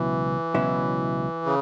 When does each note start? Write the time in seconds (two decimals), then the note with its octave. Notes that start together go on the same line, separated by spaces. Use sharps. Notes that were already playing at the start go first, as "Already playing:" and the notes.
Already playing: C#2 B2 E3 F#3 C#4 E4
0.54 C#2 B2 F#3 C#4 E4
1.45 C#3